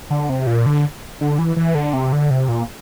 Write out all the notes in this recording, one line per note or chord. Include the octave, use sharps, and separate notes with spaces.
D3
C3
A#2
D3
D3
E3
E3
D3
C3
D3
C3
A#2